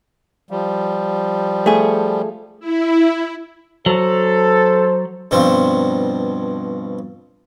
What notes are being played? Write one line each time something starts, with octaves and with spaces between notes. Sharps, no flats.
F3 G3
A3 G#4
E4
F#3 A4 C5
G2 B2 F3 C4